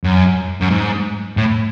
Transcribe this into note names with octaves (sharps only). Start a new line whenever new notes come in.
F#2
F#2
G#2
A2